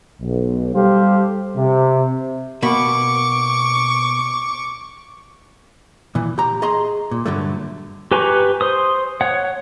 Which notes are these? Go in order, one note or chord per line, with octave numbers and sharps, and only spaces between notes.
B1
G3 G4 A4 C5 F5
C3
B2 A#3 B5 C#6 D6
A#2 E3
G4 A#5
G#4 D#5 A#5 C6
A#2
G2 D3 F#3 A3
G4 B4 G#5 A#5 C#6
C5 D#6
C#5 F#5